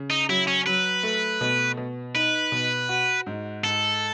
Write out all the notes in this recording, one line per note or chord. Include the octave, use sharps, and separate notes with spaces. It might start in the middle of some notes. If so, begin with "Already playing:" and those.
Already playing: C#3
D#4
F#3 E4
C#4
F#3 B4
A3
B2
B2
D#4 B4
B2
F#4
G#2
G#2 A4